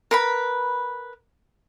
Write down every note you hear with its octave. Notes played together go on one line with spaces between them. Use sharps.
A#4 B4 B5